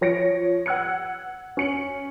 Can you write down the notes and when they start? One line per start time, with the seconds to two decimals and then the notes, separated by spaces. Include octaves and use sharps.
0.01 F3 C#5 A#6 C#7 D7
0.66 F#5 E6 F#6 G#6 C#7
1.57 C#4 C#7 F#7